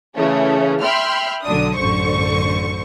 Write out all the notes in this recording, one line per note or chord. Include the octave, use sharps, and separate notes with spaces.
C#3 E3 A3 C#4
E5 G5 B5 C6 F6
B1 D3 F#3 D4 D#6
A1 F#2 D3 C5 C#6